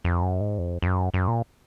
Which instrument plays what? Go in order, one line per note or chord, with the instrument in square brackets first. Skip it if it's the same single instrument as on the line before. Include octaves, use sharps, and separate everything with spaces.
[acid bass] F2
F#2
G#2
F2
F2
F#2
F#2
A#2